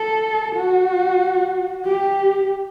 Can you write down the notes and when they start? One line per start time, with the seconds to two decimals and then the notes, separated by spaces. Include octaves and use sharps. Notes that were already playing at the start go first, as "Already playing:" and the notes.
Already playing: A4
0.55 F#4
1.85 G4